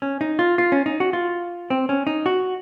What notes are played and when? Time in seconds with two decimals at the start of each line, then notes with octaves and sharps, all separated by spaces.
0.02 C#4
0.21 D#4
0.39 F4
0.58 F4
0.72 C#4
0.86 D#4
1.00 F#4
1.13 F4
1.70 C4
1.89 C#4
2.07 D#4
2.26 F#4